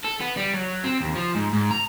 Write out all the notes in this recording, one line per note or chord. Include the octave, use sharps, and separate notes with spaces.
A4
B3
G3
F#3
C4
D#2
F3
G#2
G#2
A#5